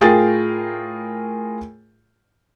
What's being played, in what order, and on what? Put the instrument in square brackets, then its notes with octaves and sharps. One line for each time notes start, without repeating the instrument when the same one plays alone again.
[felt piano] A2 F4 G#4 A#4 G5 A6